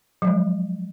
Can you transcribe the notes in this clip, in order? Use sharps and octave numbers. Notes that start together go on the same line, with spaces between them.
F3 F#3 G#3